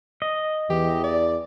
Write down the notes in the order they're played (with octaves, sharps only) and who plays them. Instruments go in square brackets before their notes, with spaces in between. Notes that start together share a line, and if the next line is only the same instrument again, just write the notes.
[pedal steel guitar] D#5
[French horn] E2 [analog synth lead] E3 [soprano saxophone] G4
[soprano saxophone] D5